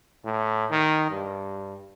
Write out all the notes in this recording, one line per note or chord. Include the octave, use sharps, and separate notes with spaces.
A2
D#3
G2